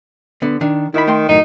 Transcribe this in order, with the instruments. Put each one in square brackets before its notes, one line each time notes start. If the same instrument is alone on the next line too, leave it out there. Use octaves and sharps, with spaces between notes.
[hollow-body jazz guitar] D3 B3
D#3 D4
[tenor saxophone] D#3 [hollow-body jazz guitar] E4 B5
[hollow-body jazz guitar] A3 G5 C6
[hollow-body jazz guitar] F#2 A2 D#3 [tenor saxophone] D#4